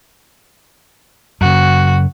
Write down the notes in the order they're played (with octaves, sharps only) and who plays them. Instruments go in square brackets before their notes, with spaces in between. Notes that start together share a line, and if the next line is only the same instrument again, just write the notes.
[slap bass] F#2 C#3 [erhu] F#4